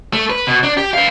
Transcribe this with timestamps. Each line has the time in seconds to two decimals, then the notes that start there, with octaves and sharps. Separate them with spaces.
0.13 A3
0.30 B4
0.47 B2
0.63 D4
0.77 G4
0.93 B4 F5